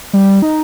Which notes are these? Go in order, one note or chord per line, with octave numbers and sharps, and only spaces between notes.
G3
D#4